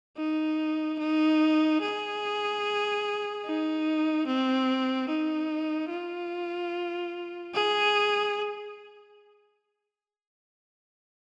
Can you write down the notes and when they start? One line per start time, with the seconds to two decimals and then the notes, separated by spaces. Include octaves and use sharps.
0.17 D#4
0.99 D#4
1.81 G#4
3.45 D#4
4.27 C4
5.09 D#4
5.91 F4
7.54 G#4